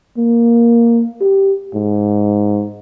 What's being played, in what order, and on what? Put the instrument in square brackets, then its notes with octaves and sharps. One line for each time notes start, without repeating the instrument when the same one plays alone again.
[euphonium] A#3
G4
G#2